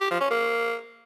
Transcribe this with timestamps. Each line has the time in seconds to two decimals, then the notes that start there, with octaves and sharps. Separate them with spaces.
0.01 G4
0.11 F3
0.21 C#4
0.31 A#3